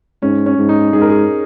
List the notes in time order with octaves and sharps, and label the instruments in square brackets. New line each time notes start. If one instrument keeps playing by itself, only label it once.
[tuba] G#2 [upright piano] C#4
[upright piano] C#4
[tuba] G#2
[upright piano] D#4
[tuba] G#2 [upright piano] G#4
[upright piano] A#4
G#4